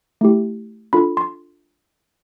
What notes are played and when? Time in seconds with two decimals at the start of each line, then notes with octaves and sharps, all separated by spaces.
0.21 A3 E4 G4
0.93 D4 F4 A4 B5
1.17 C6